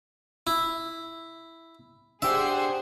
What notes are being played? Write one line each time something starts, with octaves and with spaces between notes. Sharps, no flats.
E4
D4 G4 G#4 C5 E5 F#5